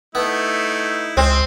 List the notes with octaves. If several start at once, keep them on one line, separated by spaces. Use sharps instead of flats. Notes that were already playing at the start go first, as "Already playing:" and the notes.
A3 B3 D#4 E4
C#2 G#3 C4